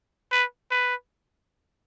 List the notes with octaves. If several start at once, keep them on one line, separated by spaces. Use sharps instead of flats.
B4
B4